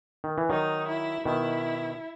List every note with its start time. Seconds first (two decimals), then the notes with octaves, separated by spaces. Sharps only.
0.24 D#3
0.38 E3
0.50 D#3 F#3 D#4
0.87 E4
1.25 B2 D#3 E4